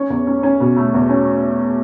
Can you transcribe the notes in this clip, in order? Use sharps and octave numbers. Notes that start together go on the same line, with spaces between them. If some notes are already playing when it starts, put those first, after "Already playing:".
Already playing: C#4 C#5
E2
C#4
C#4
B2
A3
E2
C#4